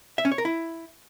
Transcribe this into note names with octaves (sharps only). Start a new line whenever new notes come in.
E5
C#4
C#5
A#4
E4